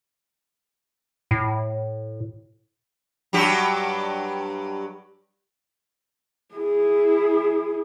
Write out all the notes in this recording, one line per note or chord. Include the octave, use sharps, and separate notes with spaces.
A2
G2 F#3 G4
E4 G#4